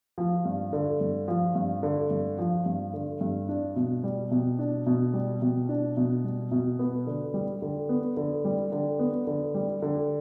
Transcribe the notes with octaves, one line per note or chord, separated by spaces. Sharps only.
F3
G2
D3
G2
F3
G2
D3
G2
F3
G2
D3
G2
D4
B2
G3
B2
D4
B2
G3
B2
D4
B2
G3
B2
B3
D3
G3
D3
B3
D3
G3
D3
B3
D3
G3
D3